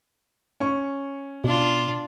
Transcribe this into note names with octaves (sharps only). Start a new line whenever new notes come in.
C#4 C#6
B2 D4 F4